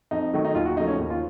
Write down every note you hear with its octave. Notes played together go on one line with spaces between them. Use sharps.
F2 D#4
D#3 F#3 A3
D#4
D#2 F4
F#4
C#3 F3 A3 D#4
C#4
D#2
F4